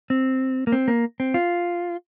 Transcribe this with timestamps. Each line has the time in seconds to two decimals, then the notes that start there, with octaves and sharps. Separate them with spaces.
0.10 C4
0.67 A#3
0.72 C4
0.88 A#3
1.20 C4
1.34 F4